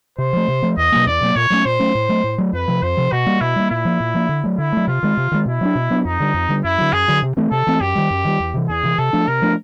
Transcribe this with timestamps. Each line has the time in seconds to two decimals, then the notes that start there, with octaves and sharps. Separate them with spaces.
0.18 C3 C5
0.33 F3 A3
0.48 C3
0.62 F3 A3
0.77 E2 D#5
0.92 B2 F#3 A#3
1.06 E2 D5
1.21 B2 F#3 A#3
1.36 A#2 C#5
1.50 F#3 A3 C#4
1.65 A#2 C5
1.79 F#3 A3 C#4
1.95 A2
2.09 F#3 A3
2.24 A2
2.38 F#3 A3
2.53 F2 B4
2.68 C3 F3
2.82 F2 C5
2.97 C3 F3
3.12 B2 F#4
3.26 G3 A#3
3.41 B2 E4
3.56 G3 A#3
3.71 A#2 E4
3.85 F3 A#3
4.00 A#2
4.14 F3 A#3
4.29 D3
4.44 F#3 A3
4.58 D3 E4
4.73 F#3 A3
4.87 C3 F4
5.03 D#3 G#3
5.17 C3
5.32 D#3 G#3
5.46 B2 E4
5.61 F#3 B3 D4
5.75 B2
5.90 F#3 B3 D4
6.05 F2 D#4
6.20 D3 G3
6.34 F2
6.49 D3 G3
6.64 F#2 E4
6.78 D3 F#3
6.93 F#2 G#4
7.08 D3 F#3
7.23 C3
7.37 E3 A3 C4
7.52 C3 A4
7.67 E3 A3 C4
7.81 F#2 G4
7.95 D#3 G3
8.11 F#2
8.25 D#3 G3
8.40 E2
8.54 C3 E3
8.69 E2 G#4
8.83 C3 E3
8.98 C3 A4
9.13 F3 A3 D4
9.28 C3 A#4
9.42 F3 A3 D4